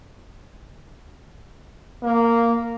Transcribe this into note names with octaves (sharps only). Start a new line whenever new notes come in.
A#3